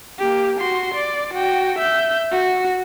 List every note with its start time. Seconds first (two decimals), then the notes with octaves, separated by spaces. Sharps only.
0.19 A#3 G4
0.59 F#4 C6
0.94 D5
1.34 F#4 G5
1.78 E5 G6
2.32 F#4